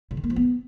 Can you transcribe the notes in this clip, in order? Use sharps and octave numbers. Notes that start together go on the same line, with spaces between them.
C#3
D#3
A#3
F3
B3